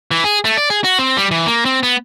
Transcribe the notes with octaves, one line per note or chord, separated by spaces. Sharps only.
E3
G#4
A3
D5
G#4
F#4
C4
G3
E3
A#3
C4
B3